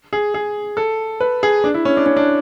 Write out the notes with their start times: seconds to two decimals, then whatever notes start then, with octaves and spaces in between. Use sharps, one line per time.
0.13 G#4
0.34 G#4
0.77 A4
1.20 B4
1.43 G#4
1.64 D4
1.74 E4
1.85 C#4
1.97 D4
2.06 C#4
2.17 D4